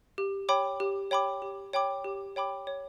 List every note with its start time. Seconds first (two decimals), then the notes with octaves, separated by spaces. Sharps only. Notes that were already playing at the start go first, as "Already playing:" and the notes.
0.18 G4
0.49 C#5 G5 B5 D6
0.80 G4
1.11 C#5 G5 B5 D6
1.42 G4
1.73 C#5 G5 B5 D6
2.04 G4
2.36 C#5 G5 B5 D6
2.67 C#5